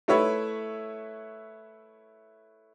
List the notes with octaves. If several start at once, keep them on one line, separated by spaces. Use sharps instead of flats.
A3 E4 B4 C#5 E5